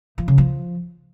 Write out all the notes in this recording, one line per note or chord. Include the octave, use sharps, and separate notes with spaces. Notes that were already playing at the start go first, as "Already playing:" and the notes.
F3
C#3
F3